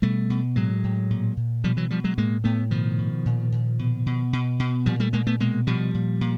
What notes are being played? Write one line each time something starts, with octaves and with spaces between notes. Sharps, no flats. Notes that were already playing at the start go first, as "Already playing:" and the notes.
B2 G3 A3
B2
A2 F#3 G#3
A2
A#2
A#2
B2 F3 G3
E3 F#3
B2 F3 G3
F#3 G#3
A2 G#3 A#3
A2 A3 B3
B2 D#3 F3
B2
A#2
A#2
B2
B2
B2
B2
A#2 F3 G3
G3 A3
A#2 G#3 A#3
A3 B3
B2 G#3 A#3
B2 F3 G3
A#2
A#2